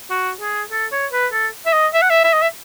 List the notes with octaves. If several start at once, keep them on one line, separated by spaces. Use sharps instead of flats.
F#4
G#4
A4
C#5
B4
A4
E5
D#5
E5
F#5
E5
E5
D#5
E5